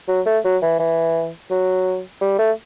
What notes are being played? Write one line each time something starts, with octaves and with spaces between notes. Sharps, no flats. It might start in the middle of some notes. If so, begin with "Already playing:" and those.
F#3
A3
F#3
E3
E3
F#3
G3
A3